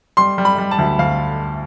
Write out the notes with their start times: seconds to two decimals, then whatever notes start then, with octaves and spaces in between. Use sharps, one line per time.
0.17 G3 C6
0.38 G3
0.45 B5
0.58 G3
0.71 A5
0.78 D2
0.99 D2 F5